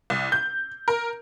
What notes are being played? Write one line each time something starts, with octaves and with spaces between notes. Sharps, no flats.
C2
G6
A#4